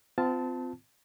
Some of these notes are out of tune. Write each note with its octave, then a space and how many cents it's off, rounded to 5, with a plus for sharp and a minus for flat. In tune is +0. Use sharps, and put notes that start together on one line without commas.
C4 -35 F4 +0 A5 +0